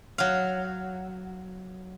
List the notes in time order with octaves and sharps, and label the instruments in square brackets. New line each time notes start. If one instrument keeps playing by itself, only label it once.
[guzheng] F#3 F5